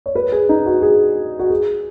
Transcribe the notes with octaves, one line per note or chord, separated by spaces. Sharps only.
C#5
B4
G#4
D#4
F#4
G#4
F#4
G#4